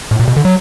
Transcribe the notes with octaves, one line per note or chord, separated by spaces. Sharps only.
A2
A#2
B2
D3
F#3